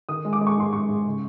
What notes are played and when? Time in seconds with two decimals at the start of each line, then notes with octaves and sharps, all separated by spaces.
0.09 D#3 D#6
0.25 G#3
0.33 D6
0.41 G#3
0.47 C#6
0.57 G#2 C6
0.73 G#2 C#6
0.89 G#2
1.06 C#3